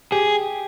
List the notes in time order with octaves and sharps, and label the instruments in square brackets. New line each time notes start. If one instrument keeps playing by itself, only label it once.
[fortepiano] G4 [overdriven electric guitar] G#4